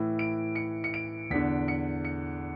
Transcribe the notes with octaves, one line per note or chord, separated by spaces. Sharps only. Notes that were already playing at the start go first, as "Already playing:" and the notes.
Already playing: A2 E3
D7
C#7
C#7
D7
E2 D3 B6
C#7
C#7